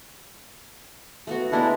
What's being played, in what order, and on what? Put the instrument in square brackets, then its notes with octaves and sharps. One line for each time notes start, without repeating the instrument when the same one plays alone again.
[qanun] A3 B3 F#4
[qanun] G#3 B3 A#4 [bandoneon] D4 E4